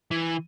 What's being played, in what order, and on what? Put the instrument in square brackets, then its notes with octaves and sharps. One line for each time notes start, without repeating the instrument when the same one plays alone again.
[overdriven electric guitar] E3